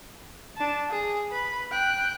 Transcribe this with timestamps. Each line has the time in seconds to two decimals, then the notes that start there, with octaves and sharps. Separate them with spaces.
0.57 D4 A5
0.90 G#4
1.31 B4 B5
1.71 G5 F#6